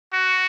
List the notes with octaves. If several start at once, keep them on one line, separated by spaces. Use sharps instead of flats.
F#4